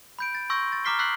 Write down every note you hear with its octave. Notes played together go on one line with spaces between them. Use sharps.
B5 G6 D7
A6
C6 C#6 E6 G6 A#6
A6
A#5 D6 F6 B6 C7 G7
E6 F#6 A6 B6 C7 F#7